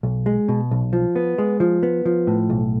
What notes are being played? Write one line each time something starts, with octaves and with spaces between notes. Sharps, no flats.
B1
G#3
B2
B1
F3
B3
G#3
F3
B3
F3
A2
B1